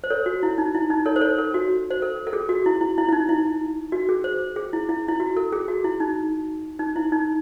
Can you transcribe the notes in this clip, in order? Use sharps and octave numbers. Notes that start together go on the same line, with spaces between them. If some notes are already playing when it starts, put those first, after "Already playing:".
C5
A4 C#5
F#4
E4
D#4
E4
D#4
A4 C#5
C5
A4 C#5
A4
F#4
C5
A4
A4
G#4
F#4
E4
E4
E4
E4
D#4
E4
F#4
G#4
C5
G#4
E4
E4
E4
F#4
A4
G#4
F#4
E4
D#4
D#4
E4
D#4